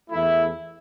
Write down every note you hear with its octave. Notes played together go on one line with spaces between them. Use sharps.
E2 E3 A3 E4